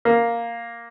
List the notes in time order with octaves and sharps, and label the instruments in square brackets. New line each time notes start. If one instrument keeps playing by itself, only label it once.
[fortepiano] A#3